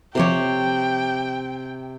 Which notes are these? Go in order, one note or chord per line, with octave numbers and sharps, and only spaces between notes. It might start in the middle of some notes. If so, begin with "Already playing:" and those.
C3 F3 G4 A4 C#5 G5